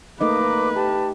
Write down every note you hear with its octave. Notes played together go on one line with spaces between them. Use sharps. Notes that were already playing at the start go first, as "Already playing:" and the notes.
A3 A#3 D#4 B4 D#5 D6
G4 A5